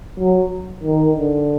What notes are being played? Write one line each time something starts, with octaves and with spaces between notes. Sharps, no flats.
F#3
D#3
D3